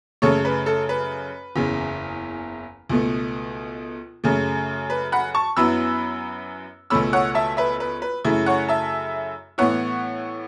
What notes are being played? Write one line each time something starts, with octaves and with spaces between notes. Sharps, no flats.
F#2 C#3 A3 A4 C#5
B4
A4
B4
F#1 E2 C#3
C#2 B2 A3
F#2 C#3 A3
B4
F#5 B5
A5 C#6
F#2 F#3 B3 E4 B5 E6
C#2 B2 A3 C#4 B5 E6
C#5 F#5
E5 A5
B4 E5
B4
B4
F#2 C#3 A3 E4
C#5 F#5
E5 A5
A2 E3 B3 E4 C#5 F#5